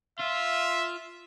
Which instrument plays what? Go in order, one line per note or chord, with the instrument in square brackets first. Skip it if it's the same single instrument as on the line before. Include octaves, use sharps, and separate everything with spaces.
[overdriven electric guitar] F4 [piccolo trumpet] E5